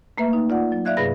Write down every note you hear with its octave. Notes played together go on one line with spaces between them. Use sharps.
A3 A#3 B4 E5
D#4
F4 D5 F#5
F#3
D5 E5 F5 F#6 G#6
G2 C3 G#4 B4 B5 A#6